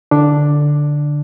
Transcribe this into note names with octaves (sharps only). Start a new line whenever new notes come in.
D3 D4